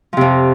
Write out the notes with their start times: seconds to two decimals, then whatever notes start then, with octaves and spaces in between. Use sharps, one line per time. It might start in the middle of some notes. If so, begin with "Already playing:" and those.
0.13 F3
0.17 C3
0.21 F2